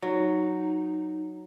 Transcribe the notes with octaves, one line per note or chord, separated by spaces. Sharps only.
F#3 D#4